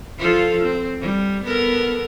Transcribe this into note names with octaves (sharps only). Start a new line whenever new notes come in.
F3 F4 A4
C4
G3
B3 A4 A#4